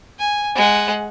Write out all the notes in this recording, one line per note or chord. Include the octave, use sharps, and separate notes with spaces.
G#5
G#3 F#5